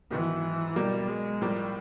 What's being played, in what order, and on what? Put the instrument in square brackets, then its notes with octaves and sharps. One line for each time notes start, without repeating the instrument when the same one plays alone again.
[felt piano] G#2 D#3 F#3 B3 [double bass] E3
[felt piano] B2 F#3 A#3 [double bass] G3
[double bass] G#3
[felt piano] A2 F3 A#3 [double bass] G3